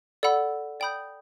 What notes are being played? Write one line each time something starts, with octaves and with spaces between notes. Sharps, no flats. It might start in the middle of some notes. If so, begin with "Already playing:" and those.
A4 D5 F#5 B5 E6
D5 G5 B5 D#6 G6